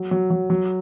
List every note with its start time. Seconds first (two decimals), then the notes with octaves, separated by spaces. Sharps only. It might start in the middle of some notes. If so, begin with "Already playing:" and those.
Already playing: F#3
0.11 F#3
0.30 F#3
0.50 F#3